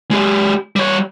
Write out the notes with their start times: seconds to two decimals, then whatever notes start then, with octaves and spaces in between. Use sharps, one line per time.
0.11 G#3 G4
0.76 G3 C#5